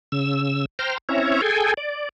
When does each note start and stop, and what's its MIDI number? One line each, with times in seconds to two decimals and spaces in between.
0.12 0.65 49
0.12 0.65 88
0.79 0.98 72
0.79 0.98 79
0.79 0.98 82
0.79 0.98 84
0.79 0.98 89
1.09 1.41 60
1.09 1.41 61
1.09 1.41 64
1.09 1.41 73
1.09 1.41 76
1.09 1.41 82
1.42 1.74 68
1.42 1.74 69
1.42 1.74 79
1.42 1.74 80
1.77 2.09 74